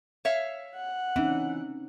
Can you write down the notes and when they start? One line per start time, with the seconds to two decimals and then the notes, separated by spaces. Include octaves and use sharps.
0.25 C#5 E5 F5
0.75 F#5
1.16 E3 C4 C#4 D#4